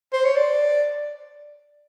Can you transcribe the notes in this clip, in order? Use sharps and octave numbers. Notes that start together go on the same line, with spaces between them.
C5
C#5
D5